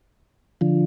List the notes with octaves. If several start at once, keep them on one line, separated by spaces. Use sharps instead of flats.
D3 F3